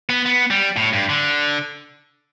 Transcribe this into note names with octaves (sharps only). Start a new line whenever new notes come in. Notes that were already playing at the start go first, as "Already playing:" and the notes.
B3
B3
G3
A2
G2
D3